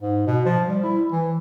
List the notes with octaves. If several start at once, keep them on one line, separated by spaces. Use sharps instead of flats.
G#2
B2
F3
G3
E4
E3